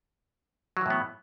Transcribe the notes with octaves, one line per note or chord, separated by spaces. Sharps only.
A2 E3 F#3 B3